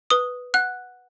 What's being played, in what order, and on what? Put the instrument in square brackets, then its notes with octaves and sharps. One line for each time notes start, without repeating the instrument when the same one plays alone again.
[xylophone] B4 D#6
F#5 F#6